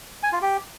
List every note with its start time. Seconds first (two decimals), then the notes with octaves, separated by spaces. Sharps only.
0.23 G#5
0.32 F4
0.42 G4